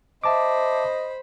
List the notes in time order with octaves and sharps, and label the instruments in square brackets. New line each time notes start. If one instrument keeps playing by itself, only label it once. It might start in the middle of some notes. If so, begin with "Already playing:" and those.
[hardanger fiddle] C5 B5 [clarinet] D#5 [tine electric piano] E5 A5 D6